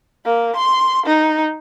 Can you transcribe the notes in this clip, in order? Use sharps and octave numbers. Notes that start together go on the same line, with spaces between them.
A#3
C6
D#4